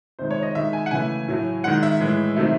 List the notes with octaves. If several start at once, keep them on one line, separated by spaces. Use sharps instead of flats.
C3 D#3 G#3 C5
C#5
D#5
D#3 G#3 E5
G#5
F#5
C#3 E3 A3 G#5
A2 F#3 A3
D#3 G#3 F#5
E5
A2 E3 G#3
C3 D#3 F#3 A3